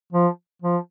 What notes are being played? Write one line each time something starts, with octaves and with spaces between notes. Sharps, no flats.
F3
F3